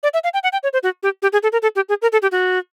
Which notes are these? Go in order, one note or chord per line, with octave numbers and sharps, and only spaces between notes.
D5
E5
F5
G5
F#5
G5
C#5
C5
F#4
G4
G4
G#4
A4
A#4
A4
G4
G#4
A#4
A4
G4
F#4